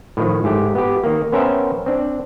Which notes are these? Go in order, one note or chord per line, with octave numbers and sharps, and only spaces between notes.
A2 D#3 F3
G#2 A3 G4
B3 G4
D#3 A#3
B3 C#4 A#4 C5 E5 G5
C4 D4